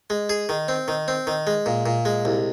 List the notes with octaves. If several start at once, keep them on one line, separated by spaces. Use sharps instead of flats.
G#3
G#4
D#3
C4
D#3
C4
D#3
G#3
A#2
A#2
G#3
C2